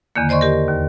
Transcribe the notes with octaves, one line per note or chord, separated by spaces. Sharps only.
E2 D3 D#3 A#3
C5 D5 D#5 C6 C#6
G4 A#4
D#2